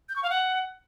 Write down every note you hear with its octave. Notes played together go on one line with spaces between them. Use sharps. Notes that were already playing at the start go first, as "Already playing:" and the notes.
G6
C#6
F5
F#5